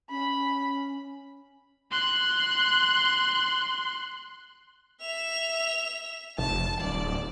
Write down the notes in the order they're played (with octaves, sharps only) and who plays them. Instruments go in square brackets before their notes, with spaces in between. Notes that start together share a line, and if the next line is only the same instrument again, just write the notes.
[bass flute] C#4 [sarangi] B5
[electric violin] C6 F#6
[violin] E5 F7
[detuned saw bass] F1 [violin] A5
[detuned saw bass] D1 [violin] D5